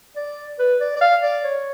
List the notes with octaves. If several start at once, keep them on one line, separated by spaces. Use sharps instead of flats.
D5
B4
D5
D5
F5
D5
C#5